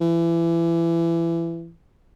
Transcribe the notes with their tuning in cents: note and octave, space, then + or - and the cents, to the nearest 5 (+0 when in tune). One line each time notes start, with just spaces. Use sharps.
E3 +25